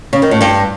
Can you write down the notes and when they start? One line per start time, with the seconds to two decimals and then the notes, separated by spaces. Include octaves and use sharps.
0.13 C#3
0.22 D#3
0.31 A2
0.41 G2